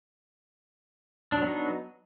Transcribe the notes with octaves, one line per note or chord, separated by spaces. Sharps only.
F#3 B3 D4 D#4